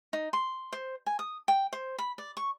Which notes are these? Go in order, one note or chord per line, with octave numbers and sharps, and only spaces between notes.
D#4
C6
C5
G#5
D#6
G5
C5
B5
D5
C#6